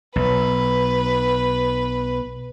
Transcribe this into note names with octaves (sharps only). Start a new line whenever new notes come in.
B1 B4